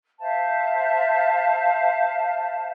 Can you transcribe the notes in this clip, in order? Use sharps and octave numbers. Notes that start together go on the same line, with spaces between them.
C5 E5 F5 A5